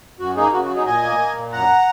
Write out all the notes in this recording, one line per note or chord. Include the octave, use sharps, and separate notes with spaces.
F#2 F#4
A#3 D#4 G#4
C#3 F#4
F#4
F#3
D#4 G#4
A#2 D#5 G#5
A#3
A#3
A#2
F#2 F#5 A#5